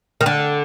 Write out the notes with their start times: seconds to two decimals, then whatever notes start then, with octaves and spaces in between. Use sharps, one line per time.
0.21 D#3
0.26 D3